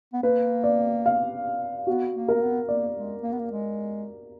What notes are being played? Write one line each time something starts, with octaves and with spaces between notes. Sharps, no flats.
B3
A#3 B4
D5
F5
B3 F#4
A#3
A#4
A#3
B3
A#3 D5
G#3
A#3
B3
A#3
G#3